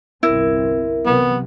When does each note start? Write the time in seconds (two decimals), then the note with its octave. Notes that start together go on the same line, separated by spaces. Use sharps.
0.23 G1 C2 C4 E4 A#4
1.06 C3 E3 F#3 B3